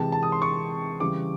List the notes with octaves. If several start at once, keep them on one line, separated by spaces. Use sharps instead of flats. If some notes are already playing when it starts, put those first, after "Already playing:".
Already playing: C3 E3 G#3 A5
A5
D#6
C6
C#6
C#3 E3 G3 D6